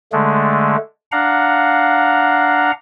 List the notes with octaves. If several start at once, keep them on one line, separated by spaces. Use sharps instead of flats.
D3 G#3 A3
D4 F5 F#5 A#5